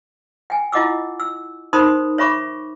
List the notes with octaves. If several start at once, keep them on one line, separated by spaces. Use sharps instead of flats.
G5 G#5
E4 F4 D#5 F#5 D6 E6
E6
D#4 A#4 C5 B5 C6 D#6
C#5 E5 B5 C#6 D6